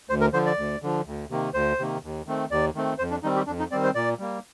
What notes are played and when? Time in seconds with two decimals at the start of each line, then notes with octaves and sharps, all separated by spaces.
0.09 D2 C5
0.21 A#4
0.33 D3 F3 C5
0.46 D5
0.57 D2
0.82 D3 F3
1.06 D2
1.30 C3 D#3 A#3
1.54 D2 C5
1.79 C3 D#3 A#3
2.03 D#2
2.26 D#3 A3 C4
2.51 D#2 D5
2.75 D#3 A3 C4
2.98 F2 C5
3.11 D4
3.23 D#3 G3 C4 D#4
3.36 G4
3.47 F2 D4
3.59 D#4
3.71 D#3 G3 C4 D5
3.84 C5
3.95 A#2 D5
4.19 G3 A#3